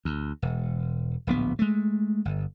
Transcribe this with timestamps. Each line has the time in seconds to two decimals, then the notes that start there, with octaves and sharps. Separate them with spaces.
0.05 D2
0.42 E1
1.27 D1 A#1 B3
1.59 G#3 A3
2.25 G1